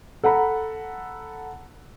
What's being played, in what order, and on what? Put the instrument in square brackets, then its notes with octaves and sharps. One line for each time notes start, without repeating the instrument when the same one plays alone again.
[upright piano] A4 F#5 A#5 B5